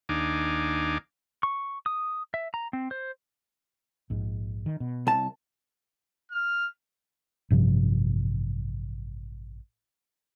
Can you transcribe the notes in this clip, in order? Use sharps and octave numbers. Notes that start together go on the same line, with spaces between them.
D#2 D4 D#4 F5 G#5 D6
C#6
D#6
E5
A#5
C4
C5
A#1 G#2
D#3
B2
C2 A5
F6
A1 G2 C3 F3